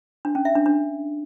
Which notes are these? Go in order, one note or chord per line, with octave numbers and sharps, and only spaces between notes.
D4
C#4
E5
D4
D4